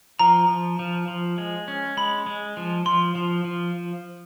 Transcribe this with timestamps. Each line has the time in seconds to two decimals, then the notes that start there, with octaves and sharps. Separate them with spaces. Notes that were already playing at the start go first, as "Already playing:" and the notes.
0.19 F3 A#5
0.48 F3
0.79 F3
1.08 F3
1.38 G#3
1.68 C#4
1.97 G#3 B5
2.27 G#3
2.57 F3
2.85 F3 C6
3.15 F3
3.45 F3